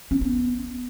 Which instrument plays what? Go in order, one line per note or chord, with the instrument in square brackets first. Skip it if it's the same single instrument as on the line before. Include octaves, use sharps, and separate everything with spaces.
[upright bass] C#4
B3